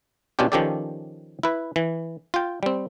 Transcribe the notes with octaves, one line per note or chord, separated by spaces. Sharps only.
B2 C#4 D4 F4 G4
D#3 F3 C#4 G4 A4 D5
E4 B4
E3
F4 G5
G3 C4